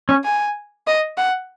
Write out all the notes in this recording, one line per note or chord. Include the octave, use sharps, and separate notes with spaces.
C#4
G#5
D#5
F#5